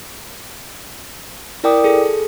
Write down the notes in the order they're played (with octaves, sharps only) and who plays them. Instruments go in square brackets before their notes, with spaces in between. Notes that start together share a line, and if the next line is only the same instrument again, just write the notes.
[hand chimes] E4 A#4 D5 G5 D6 D#6
G#4 A4